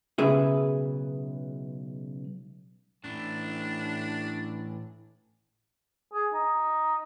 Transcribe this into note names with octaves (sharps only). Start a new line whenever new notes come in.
B1 C#3 G#4 B4 E5
A2 E3 D4
G#4
D#4